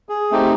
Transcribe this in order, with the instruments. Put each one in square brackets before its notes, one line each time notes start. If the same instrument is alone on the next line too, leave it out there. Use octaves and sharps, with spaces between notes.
[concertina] G#4
A3 C4 D#4 G4